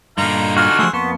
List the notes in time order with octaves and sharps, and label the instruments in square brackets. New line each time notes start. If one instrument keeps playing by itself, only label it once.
[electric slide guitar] G2 A#2 [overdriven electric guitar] D3 D#4 [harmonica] F5 A#5
[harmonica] F4 F5 G#5 [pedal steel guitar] F#4 F6
[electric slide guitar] F3 A3 [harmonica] G#4 C5 E6
[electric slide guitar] F2 A#3 A5 [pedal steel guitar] B3 [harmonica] C6 C#6